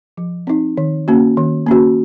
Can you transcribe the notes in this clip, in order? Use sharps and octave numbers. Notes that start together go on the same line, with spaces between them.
F3
C4 D#4
D#3
A#3 C#4 F#4
D#3
A#3 C#4 F#4